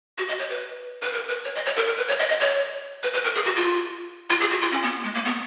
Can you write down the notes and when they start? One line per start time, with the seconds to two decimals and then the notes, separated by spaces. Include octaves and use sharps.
0.18 F#4
0.28 D#5
0.39 C#5
0.50 B4
1.02 B4
1.13 A#4
1.29 B4
1.45 C#5
1.55 D#5
1.66 C#5
1.76 A#4
1.87 A#4
1.97 B4
2.08 C#5
2.19 D#5
2.29 D#5
2.40 C#5
3.03 B4
3.14 B4
3.24 A#4
3.35 G#4
3.45 F#4
3.56 F4
4.30 F4
4.40 G#4
4.51 F#4
4.61 F4
4.72 C#4
4.83 B3
5.04 G#3
5.14 A#3
5.25 B3